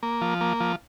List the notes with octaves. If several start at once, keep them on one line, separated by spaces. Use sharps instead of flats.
A#3
F3
A#3
F3